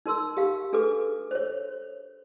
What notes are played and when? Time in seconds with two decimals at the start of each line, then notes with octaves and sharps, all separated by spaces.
0.06 D#4 A#4 C6 E6
0.37 G4 F5
0.73 D4 G#4 A4 B4 D6
1.31 C5 C#5